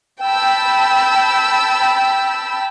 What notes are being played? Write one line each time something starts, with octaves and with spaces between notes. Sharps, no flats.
G5 A5 B5 E6